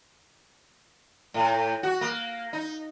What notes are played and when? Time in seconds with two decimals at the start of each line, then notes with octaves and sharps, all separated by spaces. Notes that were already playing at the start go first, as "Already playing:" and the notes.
1.34 A2
1.83 F#4
2.01 A#3
2.53 D#4